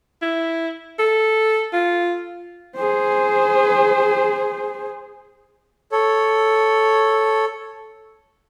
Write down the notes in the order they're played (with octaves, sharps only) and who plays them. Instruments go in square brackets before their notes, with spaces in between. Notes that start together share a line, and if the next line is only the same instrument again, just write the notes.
[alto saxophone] E4
A4
F4
[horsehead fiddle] G#4 C5
[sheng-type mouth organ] A4 C#5